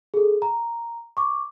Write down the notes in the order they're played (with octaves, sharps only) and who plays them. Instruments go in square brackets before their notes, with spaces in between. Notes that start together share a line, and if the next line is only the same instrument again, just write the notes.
[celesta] G#4 A4
A#5
C#6 D6